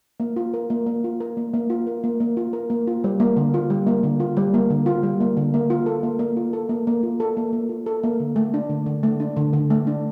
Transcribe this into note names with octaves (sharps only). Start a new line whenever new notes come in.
A#3
F4
A#4
A#3
A#3
F4
A#4
A#3
A#3
F4
A#4
A#3
A#3
F4
A#4
A#3
F4
G3
A#3
D3
F4
G3
A#3
D3
F4
G3
A#3
D3
F4
G3
A#3
D3
A#3
F4
A4
A#3
A#3
F4
A4
A#3
A#3
F4
A4
A#3
A#3
F4
A4
A#3
D3
A3
D4
D3
D3
A3
D4
D3
D3
A3
D4